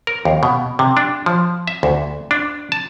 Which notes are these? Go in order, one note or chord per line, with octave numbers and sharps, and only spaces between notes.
A#4
D#2
B2
C3
D4
F3
E5
D2
D4
A5